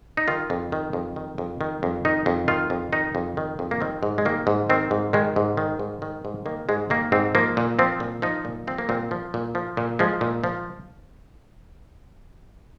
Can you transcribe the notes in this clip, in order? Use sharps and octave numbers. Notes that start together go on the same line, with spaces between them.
D#4
D#3 F4
F2
D#3
F2
D#3
F2
D#3
F2
D#3 D#4
F2
D#3 F4
F2
D#3 D#4
F2
D#3
F2
A#3
D#3 C4
G#2
G#3
D#3 A#3
G#2
D#3 C4
G#2
D#3 G#3
G#2
D#3
G#2
D#3
G#2
D#3 A#3
G#2 G#3
D#3 A#3
G#2 C4
F3 A#3
A#2
F3 C4
A#2
F3 D#4
A#2
F3 C4
A#3
A#2 C4
F3
A#2
F3
A#2
F3 G#3
A#2
F3